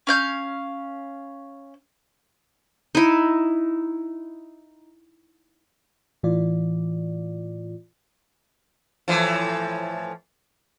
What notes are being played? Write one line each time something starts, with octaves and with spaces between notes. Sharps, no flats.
C#4 F5 G6
D#4 E4
A2 E3 F4 D5
A2 E3 F3